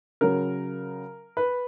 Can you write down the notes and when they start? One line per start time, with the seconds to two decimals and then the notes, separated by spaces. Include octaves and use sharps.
0.21 C#3 F#3 A#4
1.37 B4